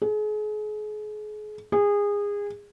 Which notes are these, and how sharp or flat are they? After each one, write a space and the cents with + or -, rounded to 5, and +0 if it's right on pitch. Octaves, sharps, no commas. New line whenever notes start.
G#4 +35
G#4 -25